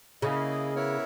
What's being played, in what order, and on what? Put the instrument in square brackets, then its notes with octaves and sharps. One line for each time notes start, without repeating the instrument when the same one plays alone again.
[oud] C#3 [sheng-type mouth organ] A#3 E4 G#4 D#5
[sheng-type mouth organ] B3 E4 A#4 C#5 E5